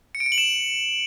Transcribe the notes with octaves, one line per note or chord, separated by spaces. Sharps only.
C#7
D7
C#7
F#7
E7